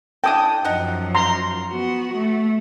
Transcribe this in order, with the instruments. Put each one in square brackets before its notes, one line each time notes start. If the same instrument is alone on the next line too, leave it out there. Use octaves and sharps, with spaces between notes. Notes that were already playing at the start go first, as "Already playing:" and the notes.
[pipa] D4 E4 A4 [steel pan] G5 D#6
[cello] F#2 F3 [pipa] D#4 F#5
[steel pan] A#5 C6
[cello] B3 F#4
A3